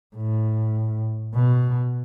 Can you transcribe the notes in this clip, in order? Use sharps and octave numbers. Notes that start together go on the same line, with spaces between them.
A2
B2